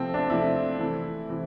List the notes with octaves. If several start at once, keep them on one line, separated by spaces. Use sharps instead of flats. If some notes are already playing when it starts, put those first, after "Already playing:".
Already playing: C3 F3 A3 C4
D4
C3 F3 A3 E4
C3 E3 A3
C3 E3